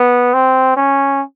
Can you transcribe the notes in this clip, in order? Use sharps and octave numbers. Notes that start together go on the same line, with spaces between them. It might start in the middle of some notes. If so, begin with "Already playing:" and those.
Already playing: B3
C4
C#4